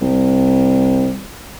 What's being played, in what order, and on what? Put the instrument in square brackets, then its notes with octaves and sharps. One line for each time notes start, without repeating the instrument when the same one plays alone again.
[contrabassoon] C2